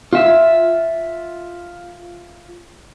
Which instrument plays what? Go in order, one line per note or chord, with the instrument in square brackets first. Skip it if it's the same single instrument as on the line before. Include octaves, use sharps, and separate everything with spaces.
[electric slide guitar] F4 E5